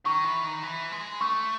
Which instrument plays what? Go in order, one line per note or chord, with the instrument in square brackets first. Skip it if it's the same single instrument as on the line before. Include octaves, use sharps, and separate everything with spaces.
[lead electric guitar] D#3 [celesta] C#6
[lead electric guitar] E3
D#3
E3
G#3
[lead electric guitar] A3 [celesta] C#6